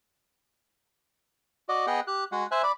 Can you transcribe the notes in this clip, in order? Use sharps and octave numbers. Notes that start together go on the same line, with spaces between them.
F#4 D5 D#5
B3 G#4 D#5 F#5 G5
G4 F#6
G#3 F#4 F#5
C5 E5 G#5 F#6
D5 B5